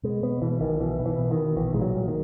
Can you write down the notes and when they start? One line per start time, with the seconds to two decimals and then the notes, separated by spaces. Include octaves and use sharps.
0.03 B2 G#3
0.23 B2 B3
0.42 B2 E3
0.61 B1 D#3
0.80 B2 E3
0.99 B2
1.06 E3
1.18 B2
1.31 D#3
1.37 B2
1.57 A#1 E3
1.74 A#2 G#3
1.82 F#3
1.95 A#2
2.08 D#3